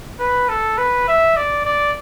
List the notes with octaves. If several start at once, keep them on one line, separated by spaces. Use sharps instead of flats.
B4
A4
B4
E5
D5
D5